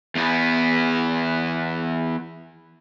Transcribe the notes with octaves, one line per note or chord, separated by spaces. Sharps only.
E2 B3